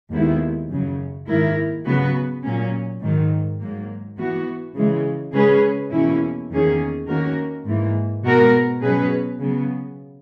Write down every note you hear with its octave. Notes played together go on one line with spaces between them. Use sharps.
D#2 D#3 G#3 B3 E4
F#2 C#3 F#3
G#2 D#3 A#3 E4 A#4
C#3 F#3 B3 F#4 B4
A#2 F#3 A#3 C#4
G#2 D#3 F#3
G#2 F#3 A#3
E3 B3 F#4
C#3 E3 G#3
C#3 G#3 C#4 G#4 B4
E2 B2 A#3 C#4 E4
E2 D#3 A#3 C#4 G#4
D#3 A#3 C#4 F#4 A#4
G#2 E3 A#3
B2 G#3 B3 F#4 A#4
B2 F#3 C#4 G#4 B4
C#3 F#3 B3